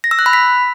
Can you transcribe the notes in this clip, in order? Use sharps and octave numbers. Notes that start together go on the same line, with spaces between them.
A#6
E6
F#6
B5
B6